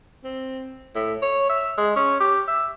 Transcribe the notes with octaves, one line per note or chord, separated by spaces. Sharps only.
C4
A2
C#5
E5
G#3
C#4
G4
E5